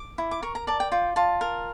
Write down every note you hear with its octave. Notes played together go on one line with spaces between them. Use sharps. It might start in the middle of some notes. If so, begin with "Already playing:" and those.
Already playing: D6
E4
D6
A#4 C#6
A#5
D5 A5
G5
F4 G5
F4 A5
A#4